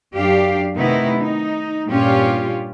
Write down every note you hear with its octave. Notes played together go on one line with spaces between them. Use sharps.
F#2 D4 G4 F5
C3 D#3 A3 B3 D#4 E4
D#4
G2 A#2 C#4 F4 G4